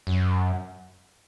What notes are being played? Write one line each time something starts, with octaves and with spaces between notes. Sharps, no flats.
F#2